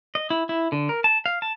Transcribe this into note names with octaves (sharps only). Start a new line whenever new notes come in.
D#5
E4
E4
D3
A#4
A5
F5
A5